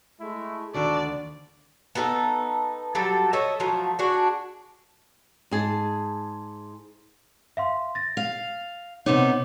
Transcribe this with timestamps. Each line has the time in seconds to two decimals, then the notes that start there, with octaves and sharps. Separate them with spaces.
0.20 G#3 A3 E4
0.74 D2 D#3 D4 F#4 A4 D5
1.95 B3 D#4 G4 A4
2.95 F#3 G3 A4
3.33 A4 C#5 D#5 E5
3.60 F3 F#3 A3
3.99 D4 F#4 G#4
5.51 G#2 G#4 A5
7.57 E5 F5 C6
7.95 A6 A#6
8.17 F5
9.06 C3 B3 D#4 C#5 D6